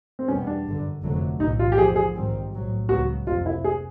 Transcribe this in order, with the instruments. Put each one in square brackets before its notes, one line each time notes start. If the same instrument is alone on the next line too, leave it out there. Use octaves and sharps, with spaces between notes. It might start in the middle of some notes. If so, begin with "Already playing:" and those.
[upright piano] C4
[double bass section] E2 B2 G3 B3 [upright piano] C#4
[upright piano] D4
[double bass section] G1 F#2 D3
F1 F2 D3 F#3 A3
[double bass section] B1 A2 E3 [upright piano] D#4
[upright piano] F4
G4
[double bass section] F2 D3 F3 [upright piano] G#4
[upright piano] G#4
[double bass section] A#1 G#2 D#3 G3 C4
B1 A2 F#3
[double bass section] C#2 C#3 F#3 B3 [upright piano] F#4
[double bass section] F#1 F2 C3 [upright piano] F4
[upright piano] E4
G#4